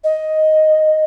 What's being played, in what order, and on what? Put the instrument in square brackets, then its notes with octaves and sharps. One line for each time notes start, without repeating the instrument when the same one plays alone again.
[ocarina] D#5